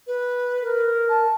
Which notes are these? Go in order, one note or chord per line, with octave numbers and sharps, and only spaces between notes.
B4
A#4
A5